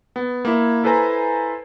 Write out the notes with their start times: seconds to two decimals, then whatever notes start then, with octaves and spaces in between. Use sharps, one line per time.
0.16 B3
0.45 A#3 E4
0.84 E4 A4 B4 C5 G#5 A#5